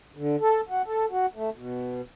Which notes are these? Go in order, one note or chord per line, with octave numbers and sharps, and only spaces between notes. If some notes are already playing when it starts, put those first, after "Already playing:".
D3
A4
F#4
A4
F#4
A3
B2